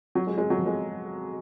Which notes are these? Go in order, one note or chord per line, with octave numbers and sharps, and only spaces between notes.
F#3
G#3
G#3
F#3
F3
G#3